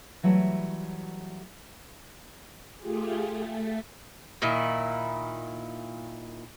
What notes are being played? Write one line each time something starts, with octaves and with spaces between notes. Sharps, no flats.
E3 F#3 G3 A3
A3 F4 G4 G#4
A3
A#2 D#3 E4